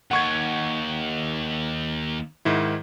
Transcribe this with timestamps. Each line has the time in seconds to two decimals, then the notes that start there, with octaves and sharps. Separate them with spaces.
0.11 D#2 F#5 C#6 G#6
2.45 G#2 D#3 E4